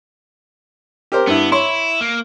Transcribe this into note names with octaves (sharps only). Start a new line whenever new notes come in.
G4 A#4 C5
G2 B3 E4
E4 C#5 C6
A#3